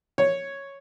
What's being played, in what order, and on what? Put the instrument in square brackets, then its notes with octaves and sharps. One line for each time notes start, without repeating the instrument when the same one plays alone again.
[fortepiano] C#5